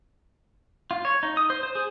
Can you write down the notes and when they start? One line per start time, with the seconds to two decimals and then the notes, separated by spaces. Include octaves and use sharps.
0.91 F4
1.05 C#5
1.23 D#4
1.37 D#6
1.50 C5
1.63 C5
1.75 G#4